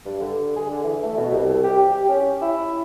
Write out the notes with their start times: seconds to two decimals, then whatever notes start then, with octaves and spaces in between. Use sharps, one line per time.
0.06 G2
0.21 D3
0.56 G#4
0.71 D3
0.84 E3
1.03 A3
1.17 B2
1.31 C2
1.64 G4
1.91 G4
2.09 C#4
2.42 E4